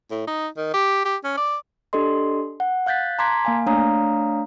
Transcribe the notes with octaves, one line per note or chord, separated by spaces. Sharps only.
A2
D#4
D#3
G4
G4
C#4
D5
D4 G4 A4 D#5 C6
F#5
F5 F#6 G6 A6 B6
A5 A#5 C6 D6 G#6 B6
A#3 F5 G#5
A3 D4 C#5 F5 A#5 D#6